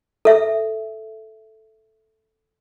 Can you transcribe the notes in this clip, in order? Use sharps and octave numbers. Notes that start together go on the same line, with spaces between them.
A4 E5